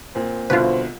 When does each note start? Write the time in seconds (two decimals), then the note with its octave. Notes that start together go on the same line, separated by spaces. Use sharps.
0.15 A#2 C4
0.50 C2 B2 D3 F4 B4 C5